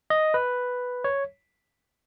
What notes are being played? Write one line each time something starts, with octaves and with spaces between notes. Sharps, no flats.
D#5
B4
C#5